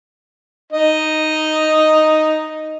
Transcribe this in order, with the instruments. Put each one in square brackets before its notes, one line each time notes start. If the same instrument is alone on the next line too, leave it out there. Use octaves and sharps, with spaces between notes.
[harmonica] D#4 D#5